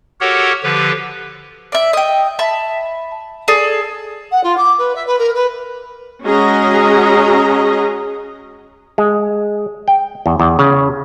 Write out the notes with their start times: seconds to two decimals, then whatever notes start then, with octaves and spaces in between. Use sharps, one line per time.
0.20 F#4 G4 A4 A#4 C#5 F#5
0.64 D3 F3 G4 B4
1.72 D5 E5
1.93 D#5 G5
2.39 E5 A5 B5
3.48 G#4 A4 D5
4.32 F#5
4.44 F4
4.57 D6
4.79 B4
4.95 E5
5.07 B4
5.19 A#4
5.35 B4
6.25 G#3 C#4 F#4 G#4 D#5 A#5
8.98 G#3
9.88 G5
10.26 E2
10.40 E2
10.59 C#3